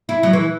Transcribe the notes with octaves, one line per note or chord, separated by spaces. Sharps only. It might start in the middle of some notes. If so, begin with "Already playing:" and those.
E4
F#3
E3